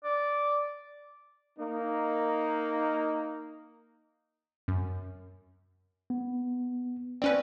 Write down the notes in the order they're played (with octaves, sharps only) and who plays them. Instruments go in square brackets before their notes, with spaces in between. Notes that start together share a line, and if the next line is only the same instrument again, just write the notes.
[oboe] D5
[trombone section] A#3 D#4
[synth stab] F#2
[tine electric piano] B3
[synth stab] C4 C#4 B4 [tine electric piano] D5